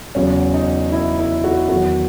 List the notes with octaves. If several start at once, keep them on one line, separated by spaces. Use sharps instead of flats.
E2 C#3 F#3 C#4
D#4
E4
E4
F#4
E2 D#3 F#3 F#4